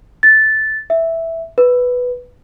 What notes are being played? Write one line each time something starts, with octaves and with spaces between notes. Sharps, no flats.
A6
E5
B4